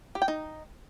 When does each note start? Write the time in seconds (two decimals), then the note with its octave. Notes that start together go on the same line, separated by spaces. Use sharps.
0.15 G4
0.22 G5
0.28 D#4